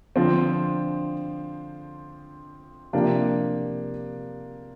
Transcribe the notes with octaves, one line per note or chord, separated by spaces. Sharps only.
D3 F3 C4
C3 F3 A#3 D4 G4